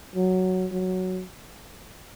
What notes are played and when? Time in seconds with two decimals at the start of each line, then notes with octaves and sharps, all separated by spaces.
0.16 F#3
0.72 F#3